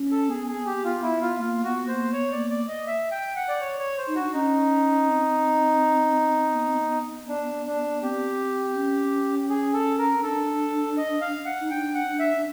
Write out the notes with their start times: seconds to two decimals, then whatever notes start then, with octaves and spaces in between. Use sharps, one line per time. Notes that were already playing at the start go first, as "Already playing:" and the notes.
Already playing: C#4
0.11 A4
0.29 B3 G#4
0.47 G#4
0.66 G4
0.84 F4
1.03 E4
1.21 F4
1.39 A#3 F4
1.64 B3 F#4
1.88 A#3 C5
2.13 B3 C#5
2.32 D5
2.38 A#3
2.50 D5
2.68 D#5
2.87 E5
3.11 G5
3.36 F#5
3.49 D5
3.61 C#5
3.79 C#5
3.98 C5
4.07 D#4
4.15 F#4
4.20 D4
4.33 C#4 D#4
5.08 C4
6.55 B3
6.68 C4
6.81 B3
7.28 D4
7.66 D4
8.02 C4 G4
8.76 C#4
9.49 G#4
9.74 A4
9.99 A#4
10.18 C#4
10.23 D4 A4
10.97 D#5
11.21 F5
11.46 F#5
11.61 D#4
11.71 D4 G5
11.95 F#5
12.07 D4
12.19 E5
12.37 D4